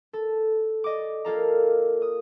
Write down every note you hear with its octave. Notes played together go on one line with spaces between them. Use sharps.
A4
D5 D#5 D6
A#3 F4 A4 A#5
D#6